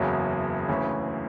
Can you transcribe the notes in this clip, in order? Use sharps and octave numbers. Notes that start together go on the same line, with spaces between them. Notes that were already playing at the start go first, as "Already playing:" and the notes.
Already playing: F#1 E2 C#3 F#3
D2 C#3 E3